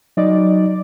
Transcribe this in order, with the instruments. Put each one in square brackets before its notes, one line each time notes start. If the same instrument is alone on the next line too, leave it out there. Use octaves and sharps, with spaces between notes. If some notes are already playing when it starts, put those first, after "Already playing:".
[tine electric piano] F#3 D#4 D#5 [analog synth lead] D5